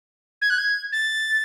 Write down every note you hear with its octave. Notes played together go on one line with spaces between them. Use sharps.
G#6
F#6
G#6
A6